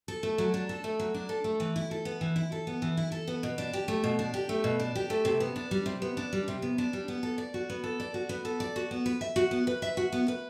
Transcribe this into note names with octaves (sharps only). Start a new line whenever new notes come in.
A4
A3
F#3
D4
A4
A3
F#3
D4
A4
A3
E3
E4
A4
B3
E3
E4
A4
B3
E3
E4
A4
B3
B2
D4
G4
A3
B2
D4
G4
A3
B2
D4
G4
A3
C3
B3
D4
G3
C3
B3
D4
G3
C3
B3
D4
G3
B3
A4
D5
F#4
B3
A4
D5
F#4
B3
A4
D5
F#4
B3
B4
E5
F#4
B3
B4
E5
F#4
B3
B4